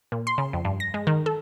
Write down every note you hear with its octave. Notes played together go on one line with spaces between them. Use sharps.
A#2
C6
C#3
F2
G2
A#6
G#3
D#3
A4